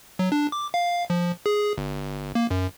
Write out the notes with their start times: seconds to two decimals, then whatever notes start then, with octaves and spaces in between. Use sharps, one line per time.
0.19 F#3
0.32 D4
0.52 D6
0.74 F5
1.10 F3
1.46 G#4
1.78 G1
2.35 A#3
2.51 F#2